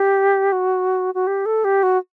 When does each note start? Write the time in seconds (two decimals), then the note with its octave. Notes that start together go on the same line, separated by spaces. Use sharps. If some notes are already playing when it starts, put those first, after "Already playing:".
Already playing: G4
0.52 F#4
1.15 F#4
1.27 G4
1.46 A4
1.64 G4
1.83 F#4